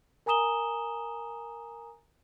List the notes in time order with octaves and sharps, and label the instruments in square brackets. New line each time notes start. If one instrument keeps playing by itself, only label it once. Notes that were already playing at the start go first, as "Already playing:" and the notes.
[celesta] A#4 G#5 A#5 D#6 E7 G7